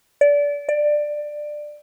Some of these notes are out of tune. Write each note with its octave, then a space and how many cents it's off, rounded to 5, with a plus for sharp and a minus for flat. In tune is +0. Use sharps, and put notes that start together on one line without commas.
D5 -25
D5 +15